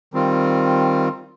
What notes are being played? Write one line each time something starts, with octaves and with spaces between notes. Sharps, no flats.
D#3 G3 C4 F4